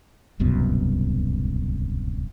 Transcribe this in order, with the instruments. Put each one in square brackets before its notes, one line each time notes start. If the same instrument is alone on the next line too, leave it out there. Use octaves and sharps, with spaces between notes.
[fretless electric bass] D1 C2 F#2 B2